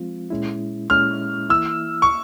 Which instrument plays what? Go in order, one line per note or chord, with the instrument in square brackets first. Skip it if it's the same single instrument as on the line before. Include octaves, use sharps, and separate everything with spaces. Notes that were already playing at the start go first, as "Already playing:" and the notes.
Already playing: [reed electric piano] F3 G#3 C4 F4
A#2 G#3 C#4 E4
[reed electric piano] A#2 G#3 C#4 E4 [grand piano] F6
[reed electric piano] E3 A#3 E4 [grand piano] E6
[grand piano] C#6